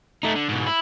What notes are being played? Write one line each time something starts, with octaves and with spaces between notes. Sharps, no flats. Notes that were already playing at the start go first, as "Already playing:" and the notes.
A3 D#4
D3
G#2 B2
E4